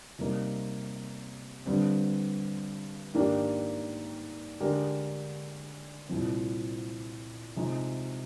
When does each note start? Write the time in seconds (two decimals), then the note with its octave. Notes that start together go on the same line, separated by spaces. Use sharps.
0.19 C3 G3 A#3 D#4
1.65 G2 D3 G3 C4
3.14 G#2 D#3 A#3 D4 G4
4.60 D3 G#3 D4 G4 A#4
6.09 C2 A#2 F3 C4
7.56 C3 F3 G#3 D#4